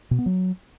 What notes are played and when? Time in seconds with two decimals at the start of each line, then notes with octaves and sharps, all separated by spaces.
0.11 B2
0.18 B3
0.26 F#3